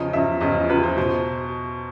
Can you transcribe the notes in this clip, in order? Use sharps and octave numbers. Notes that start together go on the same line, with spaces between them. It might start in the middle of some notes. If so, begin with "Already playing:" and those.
Already playing: E2 C#3 F3 D#5
E2 C#3 F3 E5
E2 C#3 F3 D#5
E2 C#3 F3 B4
C5
B2 C5